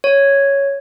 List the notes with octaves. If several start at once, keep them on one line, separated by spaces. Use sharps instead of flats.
C#5